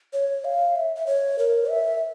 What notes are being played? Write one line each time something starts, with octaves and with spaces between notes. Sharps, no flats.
C#5
F5
E5
E5
C#5
A#4
E5